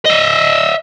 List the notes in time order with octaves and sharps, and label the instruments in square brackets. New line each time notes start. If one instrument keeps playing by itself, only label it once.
[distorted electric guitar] D#5 E5